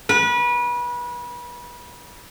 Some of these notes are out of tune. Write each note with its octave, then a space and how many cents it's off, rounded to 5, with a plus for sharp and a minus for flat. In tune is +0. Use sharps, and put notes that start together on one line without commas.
B4 -30